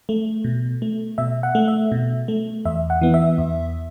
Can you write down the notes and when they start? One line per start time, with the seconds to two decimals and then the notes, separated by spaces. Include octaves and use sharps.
0.09 A3
0.44 B2
0.82 A3
1.18 B2 E5
1.43 F#5
1.55 A3
1.68 E5
1.92 B2
2.28 A3
2.65 E2 E5
2.90 F#5
3.01 E3 B3
3.14 E5
3.38 E2